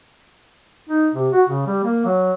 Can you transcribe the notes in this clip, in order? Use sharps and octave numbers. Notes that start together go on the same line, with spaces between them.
D#4
C3
F#4
C#3
G3
A#3
F#3